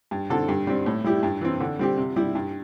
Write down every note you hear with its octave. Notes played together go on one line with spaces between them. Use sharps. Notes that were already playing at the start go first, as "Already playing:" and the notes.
G2
D3 C4 A4
G2
G3 C4
A2
G3 E4 G4
G2
E3 C4
D3
G3 C4 G4
C3
G3 E4 G4
G2